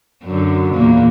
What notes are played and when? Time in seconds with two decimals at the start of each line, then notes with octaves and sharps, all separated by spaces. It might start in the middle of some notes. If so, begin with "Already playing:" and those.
0.25 F#2 D3
0.75 E2 A#2 A#3